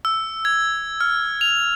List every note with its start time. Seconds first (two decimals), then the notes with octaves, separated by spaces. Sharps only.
0.05 E6
0.45 G#6
1.01 F6
1.41 F7